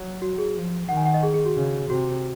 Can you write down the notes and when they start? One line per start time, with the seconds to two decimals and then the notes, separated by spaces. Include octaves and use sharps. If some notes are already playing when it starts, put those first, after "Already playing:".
Already playing: F#3
0.22 F#4
0.38 G#4
0.55 F3
0.88 D#3 F#5
0.97 G#5
1.05 F#5
1.14 D#5
1.23 G#4
1.34 G#4
1.45 F#4
1.56 C#3 G#4
1.90 C3 F#4